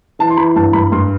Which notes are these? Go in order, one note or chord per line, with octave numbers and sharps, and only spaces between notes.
E3 A5
C6
E3 B5
G2 A5
G2 B5
G2 C6